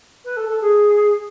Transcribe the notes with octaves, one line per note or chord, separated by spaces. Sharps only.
B4
A4
A4
G#4